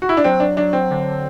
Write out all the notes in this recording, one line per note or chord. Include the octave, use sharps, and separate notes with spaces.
F#4
E4
D4
F#3 C4
D4
F#3 D4
C4
D3